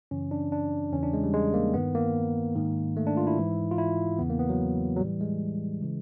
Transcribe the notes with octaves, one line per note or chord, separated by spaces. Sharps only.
F#2 C#3 E3 C#4
D4
D4
E2 C#3 E3 C#4
D4
G#3
G3
G#3
A#3
G2 D#3 B3
A#3
G#2 D#3
A3
D4
F4
E4
G#2 E3
F4
E4
E2 C#3 E3 B3
A#3
B3
F#3
F#3
A2 E3 G3
G#3
C#3 E3